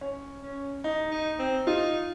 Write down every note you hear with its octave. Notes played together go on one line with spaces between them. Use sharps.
C#4
C#4
D#4
D#4
C4
D#4 F4